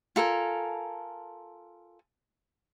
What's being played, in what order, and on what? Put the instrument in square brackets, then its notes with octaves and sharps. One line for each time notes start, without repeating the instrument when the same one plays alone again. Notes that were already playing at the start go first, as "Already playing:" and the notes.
[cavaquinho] F4 A4 A#4 G#5